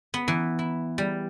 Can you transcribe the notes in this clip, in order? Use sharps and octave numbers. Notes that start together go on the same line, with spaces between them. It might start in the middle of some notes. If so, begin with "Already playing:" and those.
B3
E3
E4
G3